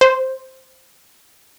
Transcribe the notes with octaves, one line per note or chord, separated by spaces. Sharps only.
C5